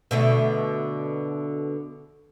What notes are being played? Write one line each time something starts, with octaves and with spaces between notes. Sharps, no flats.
B2 D3 A3